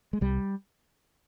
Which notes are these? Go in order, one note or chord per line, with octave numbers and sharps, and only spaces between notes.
G#3
C2 G3